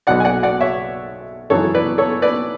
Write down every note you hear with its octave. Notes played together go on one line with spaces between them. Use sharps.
B1 B2 F#3 D5 F#5
G#5
D5 F#5
D5 F#5
C#5 E5
G#1 F#2 E3 A4 C#5
B4 D5
A4 C#5
B4 D5